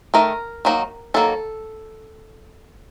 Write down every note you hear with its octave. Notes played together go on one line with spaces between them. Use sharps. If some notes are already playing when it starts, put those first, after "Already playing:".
D#3 A3 D#4 A#4
D#3 F#3 A#3 D#4
D#3 F#3 A#3 A4